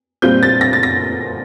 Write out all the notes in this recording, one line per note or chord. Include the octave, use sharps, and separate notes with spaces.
A#2 G3 C4 F4 G6
A6
A#6
A6
A#6